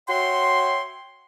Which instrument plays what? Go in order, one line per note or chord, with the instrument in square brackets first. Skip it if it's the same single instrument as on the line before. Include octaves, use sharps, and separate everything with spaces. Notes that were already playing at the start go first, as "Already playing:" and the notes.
[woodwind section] F#4 C#5 E5 G5 C6